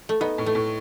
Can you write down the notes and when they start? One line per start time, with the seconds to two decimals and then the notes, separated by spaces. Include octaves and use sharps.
0.09 A3
0.21 B3 D#4
0.38 A2
0.46 A3
0.55 A2